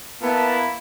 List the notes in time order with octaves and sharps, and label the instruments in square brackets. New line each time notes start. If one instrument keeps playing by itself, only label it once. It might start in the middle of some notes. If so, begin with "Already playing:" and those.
[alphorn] A#3 [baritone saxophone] B3 [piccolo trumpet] E4 [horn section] A5